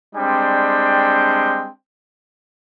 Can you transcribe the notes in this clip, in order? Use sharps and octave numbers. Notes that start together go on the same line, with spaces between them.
G3 G#3 C4 D4 G5